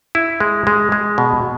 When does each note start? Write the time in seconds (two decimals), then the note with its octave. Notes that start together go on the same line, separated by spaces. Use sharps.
0.15 E4
0.40 G#3
0.67 G#3
0.92 G#3
1.18 B2